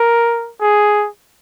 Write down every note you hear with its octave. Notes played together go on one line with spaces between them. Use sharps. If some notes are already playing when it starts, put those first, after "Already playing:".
Already playing: A#4
G#4